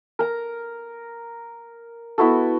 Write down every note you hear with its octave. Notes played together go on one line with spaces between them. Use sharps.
A#4 A#5
B3 E4 F#4 A4